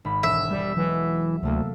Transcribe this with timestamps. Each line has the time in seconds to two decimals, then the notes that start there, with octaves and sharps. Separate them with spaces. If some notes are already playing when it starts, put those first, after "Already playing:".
0.05 G#1 B5 B6
0.23 E1 G#3 E5 E6
0.51 G3 G6
0.77 E3 F#3 G#3
1.43 D2 C3 A3 A#3